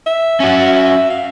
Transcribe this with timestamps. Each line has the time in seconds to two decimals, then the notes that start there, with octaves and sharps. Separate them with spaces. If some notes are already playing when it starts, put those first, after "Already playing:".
0.06 E5
0.40 C#4 F#4
1.10 F5